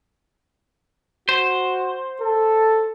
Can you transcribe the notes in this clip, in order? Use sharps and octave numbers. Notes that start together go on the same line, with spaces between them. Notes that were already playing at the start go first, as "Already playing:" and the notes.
F#4 C5
A4